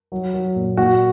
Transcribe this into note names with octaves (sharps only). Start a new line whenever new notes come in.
F#3
F#3
A#2
A#2 F#4